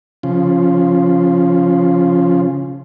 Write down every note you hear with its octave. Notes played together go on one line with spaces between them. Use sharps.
C#3 F3